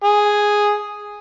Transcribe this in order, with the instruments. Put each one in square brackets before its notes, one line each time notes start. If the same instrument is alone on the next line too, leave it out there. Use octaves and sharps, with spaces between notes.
[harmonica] G#4